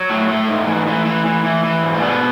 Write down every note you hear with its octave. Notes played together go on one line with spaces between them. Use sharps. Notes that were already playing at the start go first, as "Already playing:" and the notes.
Already playing: F#3
A2 A3
A2 A3
G#2
E3
E3
E3
E3
E3
E3
G#2
A3
B2 D3 B3